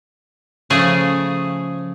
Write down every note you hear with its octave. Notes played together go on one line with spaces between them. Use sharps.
C#3 F3 A3 G#4